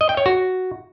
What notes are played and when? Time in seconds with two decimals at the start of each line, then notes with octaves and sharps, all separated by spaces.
0.01 D#5
0.09 G5
0.17 C#5
0.26 F#4